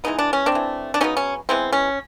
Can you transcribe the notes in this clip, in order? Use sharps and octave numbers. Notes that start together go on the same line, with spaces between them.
E3 G#3 B3 D#4
D4
C#4
C4 D4
E3 A3
D4
C#3 F#3 B3 C#4 D#4
C#4
E3 G#3 B3 C4
C#4